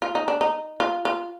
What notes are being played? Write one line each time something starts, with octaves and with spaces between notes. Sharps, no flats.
F4
D#4
D4
D#4
F4
F4